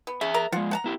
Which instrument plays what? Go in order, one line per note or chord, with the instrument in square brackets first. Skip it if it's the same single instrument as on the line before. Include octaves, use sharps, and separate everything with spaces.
[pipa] B3
[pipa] C#3 [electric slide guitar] G#4 E5
[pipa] A#4 A#5
[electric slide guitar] F3 G#3 [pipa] F4 F#5
[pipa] F#5 A5 A#5
[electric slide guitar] B3 E4 G4